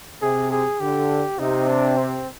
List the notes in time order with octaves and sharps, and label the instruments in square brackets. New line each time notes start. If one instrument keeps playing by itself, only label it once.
[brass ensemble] C3 [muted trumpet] G#4
[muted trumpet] G#4
[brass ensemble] D3 [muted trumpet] G4
[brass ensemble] C3 [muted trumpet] D#4
[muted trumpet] D4
C4